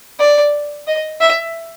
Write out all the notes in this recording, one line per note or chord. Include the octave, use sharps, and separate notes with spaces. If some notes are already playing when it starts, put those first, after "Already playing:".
D5
D#5
E5